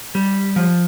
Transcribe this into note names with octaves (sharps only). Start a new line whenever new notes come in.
G3
F3